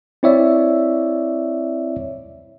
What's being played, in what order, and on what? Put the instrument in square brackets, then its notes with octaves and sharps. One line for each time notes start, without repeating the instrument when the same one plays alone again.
[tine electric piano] C4 E4 C#5 D5 E5